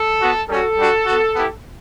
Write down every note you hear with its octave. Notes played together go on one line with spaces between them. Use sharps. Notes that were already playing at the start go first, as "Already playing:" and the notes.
Already playing: A4
B3 F#4
G3 C#4 F#4 A4
G3 D4 F#4
B3 F#4
B3 E4 G4